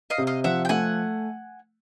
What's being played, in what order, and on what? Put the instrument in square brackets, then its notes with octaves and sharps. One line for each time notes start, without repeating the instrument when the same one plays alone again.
[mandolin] D#5 F5
[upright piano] C3
[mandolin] D#5 F5
[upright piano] F3 [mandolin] E5 F#5
[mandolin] G5
[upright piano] A3 [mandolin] F#5 G#5